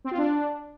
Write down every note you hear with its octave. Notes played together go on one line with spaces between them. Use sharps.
C4
F4
D4